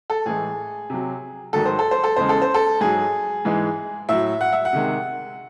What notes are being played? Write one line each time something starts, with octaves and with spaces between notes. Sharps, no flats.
A4
A2 E3 G#3 G#4
C3 F#3
G#2 D#3 F#3 A4
C5
A4
C5
A4
E2 C#3 G#3 C5
A4
C5
A4
G#2 F#3 G#4
G#2 E3 G#3
A2 F#3 E5
F#5
E5
F#5
C3 D#3 G#3